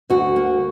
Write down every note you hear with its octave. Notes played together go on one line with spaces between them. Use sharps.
D2 F#4
A#3